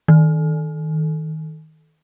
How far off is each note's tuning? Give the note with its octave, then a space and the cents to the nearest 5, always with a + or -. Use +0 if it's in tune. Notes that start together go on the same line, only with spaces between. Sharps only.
D#3 +15